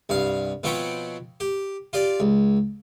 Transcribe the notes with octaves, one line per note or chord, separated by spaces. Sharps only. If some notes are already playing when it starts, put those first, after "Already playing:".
C2 G2 F5
B2 F3 C4 C#5 G5 B5
G4
F4 G4 D5
C#2